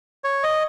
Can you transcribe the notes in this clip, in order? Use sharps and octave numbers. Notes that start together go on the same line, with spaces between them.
C#5
D#5